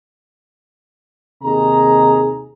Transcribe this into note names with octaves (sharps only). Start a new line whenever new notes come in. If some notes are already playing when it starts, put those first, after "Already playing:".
D#2 C3 D#4 G#4 A#5